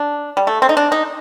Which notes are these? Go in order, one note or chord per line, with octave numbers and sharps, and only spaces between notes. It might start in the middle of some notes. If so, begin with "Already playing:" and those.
Already playing: D4
G3
A3
C4
D#4
D4
D#4